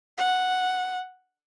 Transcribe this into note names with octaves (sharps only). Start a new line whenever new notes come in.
F#5